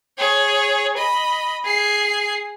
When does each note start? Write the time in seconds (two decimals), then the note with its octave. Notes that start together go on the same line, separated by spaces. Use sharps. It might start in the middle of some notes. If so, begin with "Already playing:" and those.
0.18 G#4 C#5
0.97 D#5 B5
1.65 G#4 C7